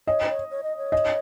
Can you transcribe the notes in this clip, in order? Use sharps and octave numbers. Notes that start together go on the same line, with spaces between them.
C#5 D#5
C5
C#5
C#5
D#5
C#5
D#5